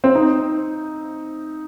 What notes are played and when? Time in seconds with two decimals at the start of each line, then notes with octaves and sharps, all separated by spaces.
0.04 C4
0.15 D#4